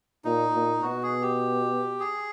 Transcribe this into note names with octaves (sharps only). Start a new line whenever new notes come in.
A#2 D#4
A#2
B2 F#4
G#4
G4
G#4